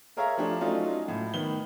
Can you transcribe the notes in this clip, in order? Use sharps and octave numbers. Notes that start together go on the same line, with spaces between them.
G#4 A#4 C#5 E5 F5 A#5
F3 A3 D4 G4
F#3 A3 C#4 D#4 F4
A2
D#3 B3 G7